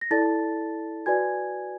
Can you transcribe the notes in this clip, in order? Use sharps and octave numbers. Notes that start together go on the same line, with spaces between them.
A#6
E4 A4 D5 A5 A6
F#4 B4 D5 G#5 G#6